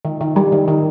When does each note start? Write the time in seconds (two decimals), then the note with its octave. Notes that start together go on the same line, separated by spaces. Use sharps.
0.05 D#3
0.21 D#3
0.36 G3
0.52 D#3
0.68 D#3